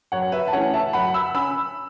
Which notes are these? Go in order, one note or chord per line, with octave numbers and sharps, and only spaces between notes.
F#2 C#5 F#5
B4 E5
A5
E3 A3 C#4 C#5 F#5
E5 A5
F#2 F#5 B5
B5 E6
C#4 B5 E6